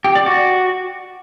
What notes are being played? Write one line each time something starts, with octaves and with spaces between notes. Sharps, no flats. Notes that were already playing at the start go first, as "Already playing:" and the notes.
G4
D5
F#4